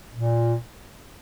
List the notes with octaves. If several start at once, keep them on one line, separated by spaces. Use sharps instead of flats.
A#2